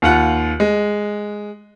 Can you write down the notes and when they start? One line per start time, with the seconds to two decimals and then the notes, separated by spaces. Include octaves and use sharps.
0.02 D#2 F4 F#5 F#6
0.60 G#3